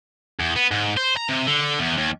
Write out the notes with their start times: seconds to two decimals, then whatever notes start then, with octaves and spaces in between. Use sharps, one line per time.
0.40 E2
0.56 B3
0.71 G#2
0.97 C5
1.17 A#5
1.29 C3
1.47 D3
1.79 E2
1.97 D#2